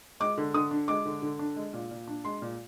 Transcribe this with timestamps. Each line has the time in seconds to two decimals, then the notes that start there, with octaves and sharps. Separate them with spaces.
0.20 G#3 D6
0.38 D3
0.54 D3 D#6
0.71 D4
0.88 G#3 D6
1.05 D3
1.22 D3
1.39 D4
1.56 G#3
1.73 A#2
1.91 A#2
2.07 D4
2.25 G#3 C6
2.42 A#2